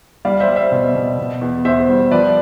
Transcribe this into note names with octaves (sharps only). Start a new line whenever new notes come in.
G3 D5 F5
C5 E5
G3
C5 E5
B2
B2
B2
E2
E2 C5 E5
G3
F3 B4 D5